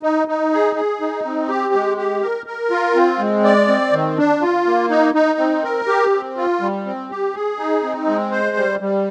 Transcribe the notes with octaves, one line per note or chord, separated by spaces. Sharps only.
D#4
D#4
G#4
G#4
D#4
C4
G4
G#3
G4
A#4
A#4
F4
C4
G#3
D5
C4
D#3
D4
F4
A#3
D#4
D#4
C4
A#4
G4
C4
F4
G3
C4
G4
G#4
D#4
C4
G#3
C5
G3
G3